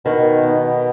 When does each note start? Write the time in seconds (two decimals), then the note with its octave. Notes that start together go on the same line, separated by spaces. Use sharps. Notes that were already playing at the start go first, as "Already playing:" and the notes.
0.05 B2 D#3
0.43 B3